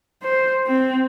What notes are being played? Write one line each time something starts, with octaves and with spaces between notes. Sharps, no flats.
C5
C4